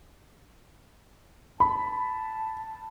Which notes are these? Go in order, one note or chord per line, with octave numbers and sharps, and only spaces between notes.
A5 B5